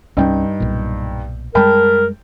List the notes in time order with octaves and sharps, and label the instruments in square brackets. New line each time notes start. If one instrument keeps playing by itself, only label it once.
[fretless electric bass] C2 C4 C#4 [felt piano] G2 D#4 G5
[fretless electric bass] B1 A#2
[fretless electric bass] F#2 G3 G#3 [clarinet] A#4 [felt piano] G5 A5 B5